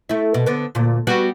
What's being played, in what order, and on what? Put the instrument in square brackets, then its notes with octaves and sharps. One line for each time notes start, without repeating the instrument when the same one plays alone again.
[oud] A3 E4
B2
D3 B3
D2 A#2
G3 B3 F#4